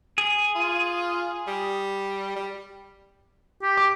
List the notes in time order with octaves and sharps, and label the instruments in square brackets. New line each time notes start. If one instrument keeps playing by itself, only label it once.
[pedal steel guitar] G#4
[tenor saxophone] F4
G3
G3
[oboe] G4
[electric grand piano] D6